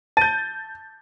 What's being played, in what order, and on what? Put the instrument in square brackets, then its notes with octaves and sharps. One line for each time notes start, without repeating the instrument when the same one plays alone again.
[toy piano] A5 [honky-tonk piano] G6 A6